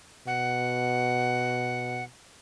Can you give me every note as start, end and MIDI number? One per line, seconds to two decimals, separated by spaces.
0.27 2.05 47
0.27 2.04 78